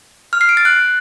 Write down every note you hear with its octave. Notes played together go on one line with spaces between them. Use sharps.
F6
C7
D7
A6
F#6